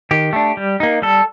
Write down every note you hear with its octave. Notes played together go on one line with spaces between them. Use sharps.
D#3 G4
A3 D4
G3
A#3 D#4
G3 A4